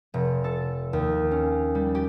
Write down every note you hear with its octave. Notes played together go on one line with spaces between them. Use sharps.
F1
A4
D#2
C#4
G3
G4